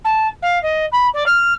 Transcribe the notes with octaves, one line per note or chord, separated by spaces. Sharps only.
A5
F5
D#5
B5
D5
F6